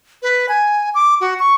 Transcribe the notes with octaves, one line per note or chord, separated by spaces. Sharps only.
B4
G#5
D6
F#4
C#6